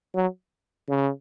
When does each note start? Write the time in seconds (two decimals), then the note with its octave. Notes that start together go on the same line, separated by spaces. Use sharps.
0.15 F#3
0.88 C#3